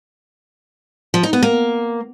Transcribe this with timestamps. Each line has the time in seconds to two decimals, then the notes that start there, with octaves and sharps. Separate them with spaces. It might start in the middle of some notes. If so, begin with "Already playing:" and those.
1.14 F3
1.23 D#4
1.33 B3
1.42 A#3